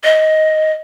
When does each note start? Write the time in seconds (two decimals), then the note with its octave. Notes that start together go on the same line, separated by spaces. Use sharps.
0.04 D#5